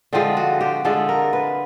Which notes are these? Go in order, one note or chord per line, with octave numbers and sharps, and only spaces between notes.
D3 F3 G#3 C4
F#4
G4
D3 F3 G#3 A4
A#4
B4